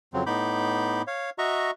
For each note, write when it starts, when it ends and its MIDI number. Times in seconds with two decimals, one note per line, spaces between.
0.13 0.24 41
0.13 0.24 49
0.13 0.24 54
0.13 0.24 60
0.27 1.02 45
0.27 1.02 59
0.27 1.02 63
0.27 1.02 83
0.27 1.02 86
0.27 1.02 91
1.07 1.30 73
1.07 1.30 77
1.38 1.71 66
1.38 1.71 75
1.38 1.71 76
1.38 1.71 82
1.38 1.71 85